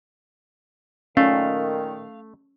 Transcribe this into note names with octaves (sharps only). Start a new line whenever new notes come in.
A#2 D#3 A3 C#4 F5